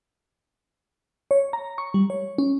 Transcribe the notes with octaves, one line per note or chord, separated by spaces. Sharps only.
C#5
A#5
C#6
G3
C#5
C#4